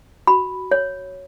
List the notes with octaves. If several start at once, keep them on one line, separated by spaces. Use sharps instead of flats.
F#4 B5
C#5